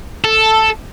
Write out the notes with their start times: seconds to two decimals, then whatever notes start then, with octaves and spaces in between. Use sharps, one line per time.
0.25 A4